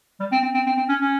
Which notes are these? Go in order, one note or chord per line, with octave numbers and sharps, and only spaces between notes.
G3
C4
C4
C4
C4
C4
C#4
C#4